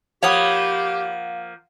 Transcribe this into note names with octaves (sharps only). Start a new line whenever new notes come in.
F3 A#3 G4 C#5 F5 F#5 B5 D#6